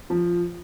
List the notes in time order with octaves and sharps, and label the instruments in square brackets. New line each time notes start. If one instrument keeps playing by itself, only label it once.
[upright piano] F3